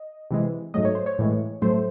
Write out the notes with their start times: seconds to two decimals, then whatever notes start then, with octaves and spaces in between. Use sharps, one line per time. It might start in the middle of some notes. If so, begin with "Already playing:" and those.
Already playing: D#5
0.31 C3 E3 G#3
0.74 G#2 F#3 A3 D#5
0.85 C#5
0.95 C5
1.06 C#5
1.19 A2 E3 G#3
1.62 A2 F#3 A3 C5